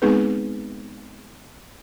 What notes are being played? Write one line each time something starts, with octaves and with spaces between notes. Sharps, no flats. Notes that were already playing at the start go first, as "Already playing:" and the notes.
G#3 B3 C4 D#4 G#4 B4